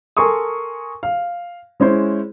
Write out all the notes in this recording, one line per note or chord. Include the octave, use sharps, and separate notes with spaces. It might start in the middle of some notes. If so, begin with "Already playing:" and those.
A4 A#4 G#5 C6 C#6 D#6
F5
G#3 C#4 E4 C5